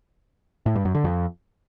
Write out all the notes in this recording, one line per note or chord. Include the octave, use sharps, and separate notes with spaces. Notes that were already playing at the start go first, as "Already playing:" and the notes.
A2
G2
F#2
D3
F2